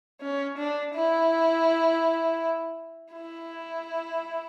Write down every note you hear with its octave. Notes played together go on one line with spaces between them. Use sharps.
C#4
D4
E4
E4